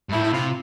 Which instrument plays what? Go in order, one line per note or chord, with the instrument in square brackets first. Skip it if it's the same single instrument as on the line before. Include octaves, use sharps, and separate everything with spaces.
[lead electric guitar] G2
[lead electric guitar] A2 [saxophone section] E4
[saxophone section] E4
[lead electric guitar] C3 [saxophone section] F4